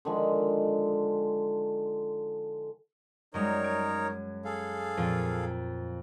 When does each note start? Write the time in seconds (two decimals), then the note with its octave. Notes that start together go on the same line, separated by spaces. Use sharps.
0.05 D3 D#3 F3 G#3
3.34 F#2 G3 G#3 D#4 A#4 C#5
3.64 G#6 D7
4.45 G#4 A4 F5
4.97 F2 A#2 F3